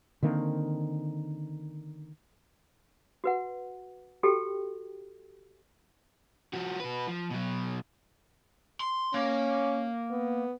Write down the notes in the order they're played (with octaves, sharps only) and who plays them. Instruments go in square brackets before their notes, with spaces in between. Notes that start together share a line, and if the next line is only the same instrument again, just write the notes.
[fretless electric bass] D3 D#3 A#3 C4
[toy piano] F#4 B4 F#5
F#4 G4 A4 G5
[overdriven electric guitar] F3 F#4
F#4 B4
F3
B2 F#3
C6
[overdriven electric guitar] A#3 [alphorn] C#4
[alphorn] B3